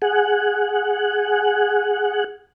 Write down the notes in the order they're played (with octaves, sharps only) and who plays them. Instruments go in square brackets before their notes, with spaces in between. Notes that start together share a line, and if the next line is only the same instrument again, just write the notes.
[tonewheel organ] G#4 F#5